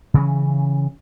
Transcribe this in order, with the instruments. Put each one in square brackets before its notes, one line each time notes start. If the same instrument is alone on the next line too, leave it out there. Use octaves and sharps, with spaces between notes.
[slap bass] C#3 E3 C#4